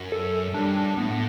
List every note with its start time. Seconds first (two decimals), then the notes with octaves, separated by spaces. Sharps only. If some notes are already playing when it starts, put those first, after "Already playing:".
Already playing: F#2
0.12 A4
0.54 G2 D4
0.76 D4
0.98 A2 B3